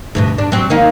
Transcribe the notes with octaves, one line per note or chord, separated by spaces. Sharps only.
D2 G2 B2
D4
F#3 C4
D#3 A#3 D#4